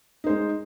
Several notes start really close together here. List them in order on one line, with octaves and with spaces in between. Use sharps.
D#4 C5 G#3